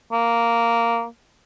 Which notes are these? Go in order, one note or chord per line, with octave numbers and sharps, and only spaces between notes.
A#3